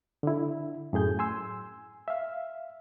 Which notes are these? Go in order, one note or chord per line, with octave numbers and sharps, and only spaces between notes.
D3 E4
F#2 A2 G#4 G6
G#5 C6 E6
E5 F5